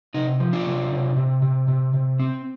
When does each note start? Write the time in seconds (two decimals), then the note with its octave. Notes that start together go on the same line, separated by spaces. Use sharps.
0.14 C3 D#4
0.40 F3
0.53 D4 F4
0.66 C3
0.91 C3
1.17 C3
1.42 C3
1.68 C3
1.94 C3
2.20 C4